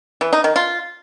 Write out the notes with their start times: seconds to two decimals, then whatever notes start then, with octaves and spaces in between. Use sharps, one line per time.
0.21 E3
0.33 D#4
0.44 D#3
0.56 F4